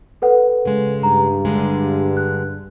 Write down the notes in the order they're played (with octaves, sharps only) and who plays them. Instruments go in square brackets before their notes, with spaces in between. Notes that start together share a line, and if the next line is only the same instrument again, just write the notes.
[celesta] A4 B4 F#5
[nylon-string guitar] C#3 G#3
[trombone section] G2 [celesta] A#5
[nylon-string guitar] D3 G3 G#3
[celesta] F#6